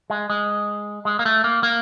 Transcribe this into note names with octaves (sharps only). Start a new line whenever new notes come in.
G#3
G#3
G#3
A#3
A3
A#3
A#3